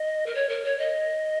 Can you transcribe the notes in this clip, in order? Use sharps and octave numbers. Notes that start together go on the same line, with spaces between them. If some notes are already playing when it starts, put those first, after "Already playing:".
Already playing: D#5
A#4
C#5
A#4
C#5
D#5